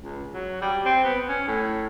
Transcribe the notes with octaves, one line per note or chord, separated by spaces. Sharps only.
C#2
F#3
G3
C4
B3
C#4
A2